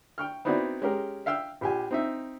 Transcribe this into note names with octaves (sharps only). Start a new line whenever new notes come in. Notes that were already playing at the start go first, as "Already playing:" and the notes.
G5 C#6 F6
B3 C4 D#4 E4 F#4 D5
G#3 C#4 G4 A#4
E5 F5 G5 E6
A#1 G4 G#5
C4 D#4 E5